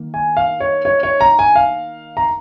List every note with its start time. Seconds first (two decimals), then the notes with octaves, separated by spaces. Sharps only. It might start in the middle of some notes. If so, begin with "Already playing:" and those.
Already playing: D#3 A#3
0.14 G#5
0.37 F5
0.60 C#5
0.85 C#5
1.03 C#5
1.21 A#5
1.39 G#5
1.56 F5
2.17 A#5